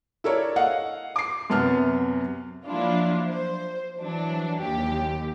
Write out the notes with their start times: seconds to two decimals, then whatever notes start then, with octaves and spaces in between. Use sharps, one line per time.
0.24 E4 A4 A#4 C#5 D5
0.56 D#5 F5 F#5
1.16 D6 C7
1.50 F#2 C3 B3 A5 F6
2.66 F3 F#3 A#3 D4 E4 F4
3.28 C5
4.00 E3 F#3 D4
4.61 D#2 G4